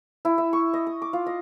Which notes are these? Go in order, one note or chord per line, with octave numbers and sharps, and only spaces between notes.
E4
E5
C#6
D#5
D#6
D6
F4
D#5